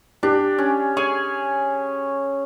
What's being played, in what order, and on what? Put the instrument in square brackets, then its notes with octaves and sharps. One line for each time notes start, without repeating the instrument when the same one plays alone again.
[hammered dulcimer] D4 [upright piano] G4
[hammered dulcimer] C#4
G#4 C#5 G#5